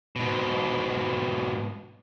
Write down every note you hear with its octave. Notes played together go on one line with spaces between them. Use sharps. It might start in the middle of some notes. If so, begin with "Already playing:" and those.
G#2 B2